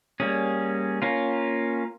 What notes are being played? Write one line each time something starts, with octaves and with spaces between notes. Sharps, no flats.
G3 A#3 C#4 G#4
A#3 C#4 F4